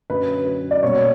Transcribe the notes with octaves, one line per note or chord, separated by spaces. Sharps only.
F#2 D3 F#3 C#4 B4
B4
D5
B2 G3 A#3 C#5